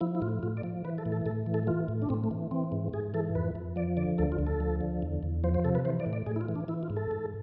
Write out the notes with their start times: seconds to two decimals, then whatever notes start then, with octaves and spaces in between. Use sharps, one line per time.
0.01 F3 E4
0.15 E4
0.22 A2 F4
0.43 A2 F4
0.57 D5
0.63 F3
0.85 E3 B4
0.98 A4
1.06 A2
1.12 A4
1.26 A2 A4
1.46 E3
1.54 A4
1.67 E3 F4
1.88 A2
2.02 D4
2.09 A2 C4
2.24 A3
2.31 E3
2.51 E3 C4
2.72 G#2
2.93 G#2 G#4
3.14 E3 A4
3.35 F2 B4
3.55 F2
3.76 F3 D5
3.97 D3 D5
4.18 D2 A4
4.32 F4
4.39 D2
4.47 A4
4.60 F3
4.81 D3
5.02 E2
5.23 E2
5.44 F3 C5
5.54 C5
5.64 C3 A4
5.75 B4
5.85 E3 C5
6.00 D5
6.06 A2
6.13 D5
6.26 A2 G#4
6.36 E4
6.41 F4
6.49 E3
6.56 D4
6.68 E3 E4
6.83 F4
6.90 G#2
6.97 A4
7.11 G#2